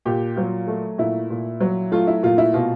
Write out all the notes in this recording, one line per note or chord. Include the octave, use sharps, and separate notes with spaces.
A#2 G4
F#3 F4
A3
A#2 E4
A#2
F#3
A3 F4
E4
A#2 F4
E4
B2 F4